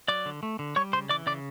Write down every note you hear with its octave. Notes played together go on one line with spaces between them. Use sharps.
F#3 D5 D6
D3
A3
D3
G3 C#5 C#6
C#3 C5 C6
E3 D5 D6
C#3 D5 D6